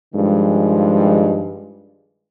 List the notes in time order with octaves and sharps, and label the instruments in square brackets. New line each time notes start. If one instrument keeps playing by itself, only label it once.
[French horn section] G2 D#3 F3 G#3